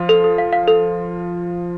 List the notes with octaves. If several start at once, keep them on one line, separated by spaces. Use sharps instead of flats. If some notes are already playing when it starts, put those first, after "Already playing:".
Already playing: F3 F4
A4
A4
F5
F5
A4